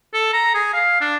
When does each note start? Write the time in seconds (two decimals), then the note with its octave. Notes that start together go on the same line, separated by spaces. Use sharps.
0.14 A4
0.33 A#5
0.54 G#4
0.74 F5
1.01 D4